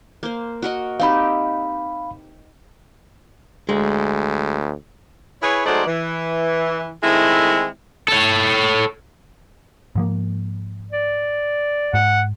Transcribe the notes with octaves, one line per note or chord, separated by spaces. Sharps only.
A#3 C5
F#4 A#4 D#5
C4 D#4 G4 F5 B5
D2 G#3
E4 G#4 B4 C#5
F#3 G#3 A3 D#4 C5 D5
E3
D#3 G#3 A3 C4 E4
A4 C#5
G#2 F3 A#3
D5
G#2 F#5